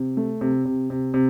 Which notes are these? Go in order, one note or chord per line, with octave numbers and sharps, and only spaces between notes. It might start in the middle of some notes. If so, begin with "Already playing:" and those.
Already playing: C3
A3
C3
C3
C3
C3